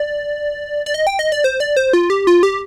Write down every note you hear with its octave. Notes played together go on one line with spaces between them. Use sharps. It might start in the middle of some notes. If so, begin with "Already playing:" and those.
Already playing: D5
D5
D#5
G5
D#5
D5
C5
D5
C5
F4
G4
F4
G4